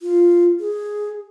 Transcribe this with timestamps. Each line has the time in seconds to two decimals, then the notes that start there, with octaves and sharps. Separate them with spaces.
0.02 F4
0.60 G#4